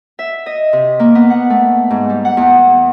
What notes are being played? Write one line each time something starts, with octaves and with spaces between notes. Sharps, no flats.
E5
D#5
C3
A#3
B3
F#5
A3
G#2
G3
F#5
E2